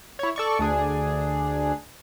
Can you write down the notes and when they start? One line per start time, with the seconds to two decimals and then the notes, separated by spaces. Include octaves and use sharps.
0.19 E4 C#5
0.36 A4 D5 C#6
0.59 D2 D4 G#4